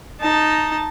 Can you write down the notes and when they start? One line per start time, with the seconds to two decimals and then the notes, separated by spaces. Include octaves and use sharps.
0.21 D#4 A5